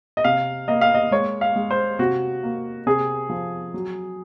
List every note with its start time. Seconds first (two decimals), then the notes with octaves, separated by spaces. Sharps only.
0.17 D#5
0.24 C3 F5
0.68 A#3 D#5
0.81 F5
0.94 D#5
1.11 G#3 C#5
1.41 F5
1.56 G#3
1.71 C5
1.99 C3 F#4
2.43 A#3
2.86 C3 G#4
3.29 F3
3.74 F#3